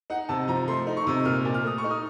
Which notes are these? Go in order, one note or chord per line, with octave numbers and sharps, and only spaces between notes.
D#4 F#5
C3 A5
F3 A#5
A3 C6
D#4
C#6
C3
A#2 F6
A#2
F6
A3 D#6
C#6
D#4
D#6